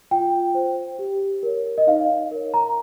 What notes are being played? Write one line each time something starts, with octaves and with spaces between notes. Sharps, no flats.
F4 G5
C5
G4
A#4 C#5
D#5
D#4 F5
A#4 C#5
A#5